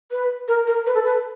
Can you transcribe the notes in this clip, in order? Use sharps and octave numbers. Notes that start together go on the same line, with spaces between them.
B4
A#4
A#4
B4
A4
B4